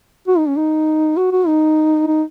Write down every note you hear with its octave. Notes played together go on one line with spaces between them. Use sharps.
F#4
D#4
C#4
D#4
F#4
F#4
D#4
D#4